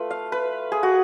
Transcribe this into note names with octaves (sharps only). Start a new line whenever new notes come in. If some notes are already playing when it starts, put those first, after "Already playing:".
Already playing: A3 F4 B4
F5
B4
G#4
F#4